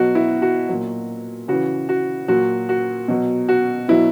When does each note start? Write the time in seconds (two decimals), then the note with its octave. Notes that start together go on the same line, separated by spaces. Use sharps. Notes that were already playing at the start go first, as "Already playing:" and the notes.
Already playing: B2 F#3 F#4
0.15 E4
0.42 F#4
0.69 A#2 F#3
1.48 C#3 E3 F#4
1.89 F#4
2.28 A#2 F#3 F#4
2.69 F#4
3.08 B2 F#3
3.49 F#4
3.88 B2 F#3 E4